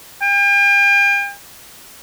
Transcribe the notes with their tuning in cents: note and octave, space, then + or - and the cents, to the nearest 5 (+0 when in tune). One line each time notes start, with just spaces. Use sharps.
G5 +40